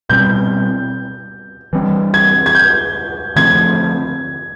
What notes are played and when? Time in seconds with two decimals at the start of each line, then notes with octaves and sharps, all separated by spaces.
0.10 B2 G3 C4 G6
1.73 E3 G3 C4
2.14 G#6
2.46 G#6
2.55 G6
3.36 D3 F3 A3 C4 G#6